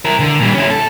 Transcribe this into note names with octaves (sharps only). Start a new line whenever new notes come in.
E4 A#4
D3
A#2 G3
C#4 E4
A4